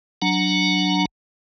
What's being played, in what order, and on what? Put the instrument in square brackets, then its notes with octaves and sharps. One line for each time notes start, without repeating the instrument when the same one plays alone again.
[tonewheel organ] F#3 D4 F#5 A#5